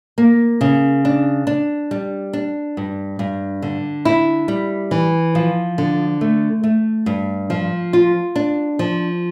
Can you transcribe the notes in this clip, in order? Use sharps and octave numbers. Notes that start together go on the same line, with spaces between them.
A#3
C#3
D4
D4
G3
D4
G2
G2
D3
E4
G3
E3
F3
D3
A3
A3
G2
F3
F4
D4
F3